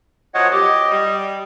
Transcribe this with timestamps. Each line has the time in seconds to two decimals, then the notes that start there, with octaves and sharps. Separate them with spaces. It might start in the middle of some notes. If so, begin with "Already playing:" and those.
0.34 F#2 F3 C#5 D#5 F#5
0.51 G4 D#5
0.92 G3